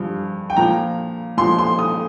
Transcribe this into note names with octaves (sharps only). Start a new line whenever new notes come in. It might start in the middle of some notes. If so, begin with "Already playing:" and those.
Already playing: G2 F3
G5
A#2 F3 A#5
A#2 F3 C6
C6
D#6